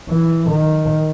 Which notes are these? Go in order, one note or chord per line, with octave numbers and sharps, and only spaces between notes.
E3
D#3